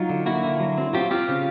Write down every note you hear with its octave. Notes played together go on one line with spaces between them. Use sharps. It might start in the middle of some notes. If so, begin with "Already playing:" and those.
Already playing: F#3 D#4 F4
D3
A#3 E4 F#4
D3
F#3
C4
F#3 F4 G4
C4 F4 G4
C#3